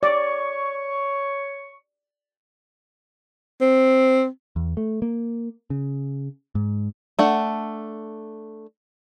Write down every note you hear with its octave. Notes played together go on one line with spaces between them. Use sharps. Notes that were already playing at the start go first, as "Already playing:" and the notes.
C#5 D5 C#6
C4
E2
A3
A#3
C#3
G#2
A3 D4 F#5